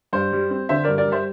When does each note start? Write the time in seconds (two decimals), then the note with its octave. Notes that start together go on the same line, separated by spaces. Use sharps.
0.13 G2 C5
0.32 G3
0.51 C4
0.69 D3 C5 E5
0.84 G2 A#4 D5
0.98 A#4 D5
1.08 G3 C5 E5